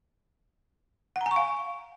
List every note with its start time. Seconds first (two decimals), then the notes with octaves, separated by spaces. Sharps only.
1.16 F#5
1.21 A#5
1.26 G#5
1.31 C#6
1.36 F5